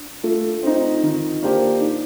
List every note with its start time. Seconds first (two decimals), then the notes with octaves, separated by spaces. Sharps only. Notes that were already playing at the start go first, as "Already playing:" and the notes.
Already playing: D4
0.24 A3 F4
0.63 C4 D#4
1.03 D#3
1.43 A#3 D4 G4 C5
1.81 D#4